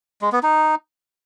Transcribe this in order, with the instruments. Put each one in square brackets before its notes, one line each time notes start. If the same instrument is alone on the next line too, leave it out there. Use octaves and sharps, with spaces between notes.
[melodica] G#3
B3
D#4